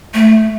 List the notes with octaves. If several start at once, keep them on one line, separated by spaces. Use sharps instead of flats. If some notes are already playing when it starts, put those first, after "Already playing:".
A3